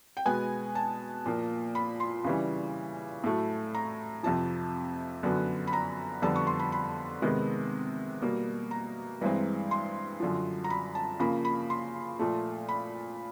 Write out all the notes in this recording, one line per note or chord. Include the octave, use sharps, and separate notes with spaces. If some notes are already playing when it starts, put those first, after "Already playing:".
G5
B2 G#3 B3 G#5
A5
A#2 F3 A#3
B5
C6
C#3 E3 G3
A2 F#3 A3
A#5
F2 C3 F3 A5
F#2 D3 F#3 B3
B5
A#5
F2 D3 G3 B3 A5
C#6
C6
B5
B5
C3 D#3 G#3 B3
B2 G3 A#3
A#5
G2 E3 G#3 C4
C6
F#2 D3 F3
A#5
B5
A5
C#3 F3 A#3 B5
B5
C6
A#2 F3 A3
B5